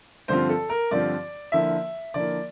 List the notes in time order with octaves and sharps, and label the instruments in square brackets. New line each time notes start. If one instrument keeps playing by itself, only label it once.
[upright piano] G2 D3 F3 C4 F4 C5
A4
A#4
G2 D3 F3 C4 F4 D5
D3 F3 A#3 E4 E5
D3 F3 A#3 E4 D5